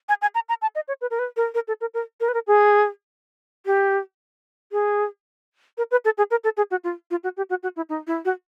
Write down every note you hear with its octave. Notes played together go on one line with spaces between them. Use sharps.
G#5
G#5
A#5
A#5
A5
D#5
C#5
B4
A#4
B4
A#4
A#4
A4
A#4
A#4
A#4
B4
A#4
G#4
G4
G#4
A#4
B4
A4
G#4
A#4
A4
G#4
F#4
F4
F4
F#4
G4
F#4
F#4
E4
D#4
E4
F#4